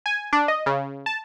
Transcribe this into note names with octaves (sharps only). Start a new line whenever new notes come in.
G#5
D4
D#5
C#3
A5